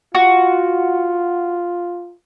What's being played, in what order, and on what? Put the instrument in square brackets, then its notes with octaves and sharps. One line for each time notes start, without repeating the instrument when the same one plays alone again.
[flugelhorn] F4 [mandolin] F#4